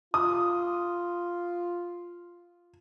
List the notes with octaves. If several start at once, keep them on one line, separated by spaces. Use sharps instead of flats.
F4 D#6